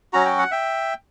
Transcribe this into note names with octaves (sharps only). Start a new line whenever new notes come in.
F#3 C#4 F#4 A#5
G5
F#5
E5 G5